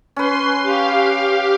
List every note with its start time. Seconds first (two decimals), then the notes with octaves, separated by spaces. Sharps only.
0.16 C#4 B4 C6
0.63 G4 F5